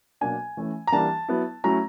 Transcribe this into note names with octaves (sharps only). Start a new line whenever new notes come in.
B2 F#3 A#3 D4 G#5
E3 A3 C#4
A#5
E3 G3 A#3 D4 A5
F#3 B3 E4
F#3 A3 C#4 E4 A#5